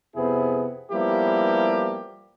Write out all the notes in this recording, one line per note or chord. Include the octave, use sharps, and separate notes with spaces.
F2 C3 B3 C4 E4 G#4
F3 G3 A#3 B3 E4 G4